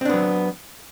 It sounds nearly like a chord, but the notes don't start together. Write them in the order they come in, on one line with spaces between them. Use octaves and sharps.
C4 D4 B3 F#3